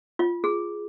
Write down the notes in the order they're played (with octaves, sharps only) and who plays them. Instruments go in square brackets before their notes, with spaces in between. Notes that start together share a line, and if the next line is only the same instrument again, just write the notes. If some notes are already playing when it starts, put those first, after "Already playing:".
[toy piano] F4
G#4